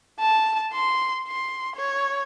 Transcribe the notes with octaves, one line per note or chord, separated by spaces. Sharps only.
A5
C6
C6
C#5